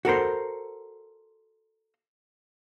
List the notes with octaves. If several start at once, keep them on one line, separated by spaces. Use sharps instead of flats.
F#4 A4 A#4 C5